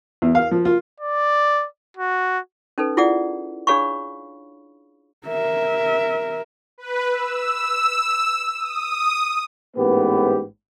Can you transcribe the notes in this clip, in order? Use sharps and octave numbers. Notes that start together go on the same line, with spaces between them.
E2
F5
F3
F4
D5
F#4
C#4 D#4 A4 B4
E4 F4 G#4 D5 F#5
D4 G#4 C#5 F5 B5 C#6
A#4 E5
B4
E6
D#6
A1 G#2 A#3 B3 G4 B4